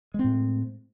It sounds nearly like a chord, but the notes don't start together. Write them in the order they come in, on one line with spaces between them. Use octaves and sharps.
G#3 C4 A2